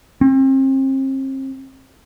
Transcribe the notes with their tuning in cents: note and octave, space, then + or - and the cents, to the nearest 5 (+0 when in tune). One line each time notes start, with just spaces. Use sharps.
C4 +40